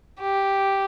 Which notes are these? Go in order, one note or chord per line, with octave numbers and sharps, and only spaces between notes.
G4